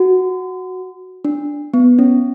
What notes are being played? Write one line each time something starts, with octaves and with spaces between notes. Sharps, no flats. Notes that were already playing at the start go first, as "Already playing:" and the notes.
Already playing: F#4
D4
B3
C#4